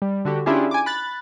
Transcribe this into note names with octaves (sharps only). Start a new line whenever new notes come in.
G3
D3 F#4 G4
C#4 D4 E4 F4 G4 G#4
G#5 D6
B5 F#6 A6